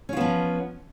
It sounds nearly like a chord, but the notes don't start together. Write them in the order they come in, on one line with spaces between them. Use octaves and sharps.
C#4 F4 B3 F3